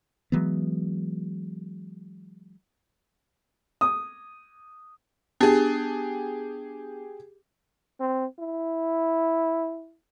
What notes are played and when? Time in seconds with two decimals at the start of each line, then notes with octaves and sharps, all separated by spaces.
0.32 E3 F#3 G#3 B3
3.81 D#6
5.40 B3 D4 G4 G#4 A5
8.00 C4
8.39 E4